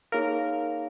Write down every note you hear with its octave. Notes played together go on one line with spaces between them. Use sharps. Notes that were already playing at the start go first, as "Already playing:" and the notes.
A#3 D#4 G#4 A#4 C#5 F5